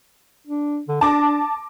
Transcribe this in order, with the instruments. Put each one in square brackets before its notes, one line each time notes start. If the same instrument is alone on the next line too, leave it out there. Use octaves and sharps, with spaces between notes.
[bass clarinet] D4
D3
[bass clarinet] D4 [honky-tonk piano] A5 D6 A#6